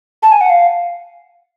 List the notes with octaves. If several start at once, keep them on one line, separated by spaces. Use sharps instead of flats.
A5
G#5
F#5
F5